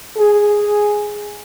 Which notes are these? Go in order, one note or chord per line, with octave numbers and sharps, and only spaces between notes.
G#4